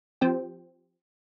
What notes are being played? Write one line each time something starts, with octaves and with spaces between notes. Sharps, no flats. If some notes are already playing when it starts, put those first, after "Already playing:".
F3 C4 G4